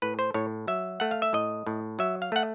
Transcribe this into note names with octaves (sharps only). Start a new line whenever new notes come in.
A2 B4
C5
A2 C#5
F#3 E5
A3 F#5
F5
E5
A2 D#5
A2
F#3 E5
F5
A3 F#5